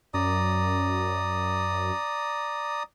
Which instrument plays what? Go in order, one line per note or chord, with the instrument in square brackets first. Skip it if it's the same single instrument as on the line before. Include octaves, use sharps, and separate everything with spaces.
[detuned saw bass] F#2 [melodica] D5 A#5 D#6